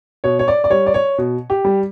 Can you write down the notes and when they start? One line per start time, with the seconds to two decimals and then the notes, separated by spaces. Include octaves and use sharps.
0.24 B2 C#5
0.39 C#5
0.48 D5
0.64 D5
0.70 G3 C#5
0.86 D5
0.94 C#5
1.18 B2
1.50 G4
1.64 G3